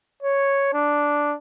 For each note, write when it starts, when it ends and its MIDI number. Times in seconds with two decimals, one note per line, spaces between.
0.23 0.70 73
0.73 1.35 62